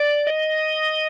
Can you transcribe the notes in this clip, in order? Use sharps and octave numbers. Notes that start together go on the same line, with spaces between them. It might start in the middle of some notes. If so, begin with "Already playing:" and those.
Already playing: D5
D#5